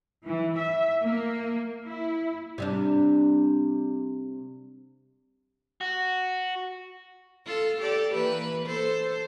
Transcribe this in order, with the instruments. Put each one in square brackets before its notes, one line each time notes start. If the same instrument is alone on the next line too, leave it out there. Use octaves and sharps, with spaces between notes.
[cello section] E3
E5
A#3
E4
[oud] C3 G3 D4
[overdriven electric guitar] F#4
[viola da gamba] F4 A4
G4 A4 D5
E3 A#3 B4
A4 C5